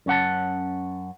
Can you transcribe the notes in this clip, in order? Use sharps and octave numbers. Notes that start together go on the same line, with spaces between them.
F#2 C#4 F#5 A5